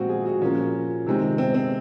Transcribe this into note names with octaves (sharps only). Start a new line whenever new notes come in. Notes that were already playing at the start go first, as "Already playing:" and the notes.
Already playing: A#2 F3 G#3 C4 F4 F#4
G#4
F#4
A#2 F3 A#3 C#4
C3 D#3 G#3 C4
C4
C4